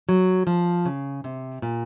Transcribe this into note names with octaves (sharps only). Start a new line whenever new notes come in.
F#3
F3
C#3
C3
A#2